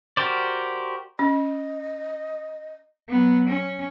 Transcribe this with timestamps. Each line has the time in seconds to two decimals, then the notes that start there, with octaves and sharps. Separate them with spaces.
0.17 F#4 G4 A#4 C5 D5
1.19 C#4 D#5
3.09 F#3 B3
3.48 C#4